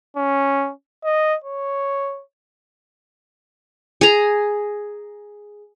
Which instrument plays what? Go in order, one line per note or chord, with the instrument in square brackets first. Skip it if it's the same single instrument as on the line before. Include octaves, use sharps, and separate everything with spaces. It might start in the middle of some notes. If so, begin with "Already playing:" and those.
[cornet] C#4
D#5
C#5
[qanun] G#4 A#5